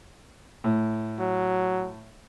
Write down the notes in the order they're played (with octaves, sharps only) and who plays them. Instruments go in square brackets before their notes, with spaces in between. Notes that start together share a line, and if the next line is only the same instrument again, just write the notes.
[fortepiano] A2
[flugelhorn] F#3